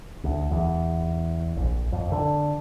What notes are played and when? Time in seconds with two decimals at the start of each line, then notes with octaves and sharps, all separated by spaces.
0.24 D2
0.51 E2
1.56 A#1
1.92 F2
2.12 D3